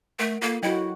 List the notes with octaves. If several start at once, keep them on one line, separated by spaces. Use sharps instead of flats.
A3 A#4 F#5
A#3 F4 A4 F5
F#3 E4 F#4 C#5 D#5 G5